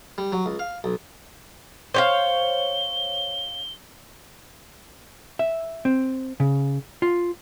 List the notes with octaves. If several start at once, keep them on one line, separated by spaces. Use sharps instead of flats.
G3
F#3
C#2
F5
B1
C5 C#5 F5 G7
E5
C4
C#3
F4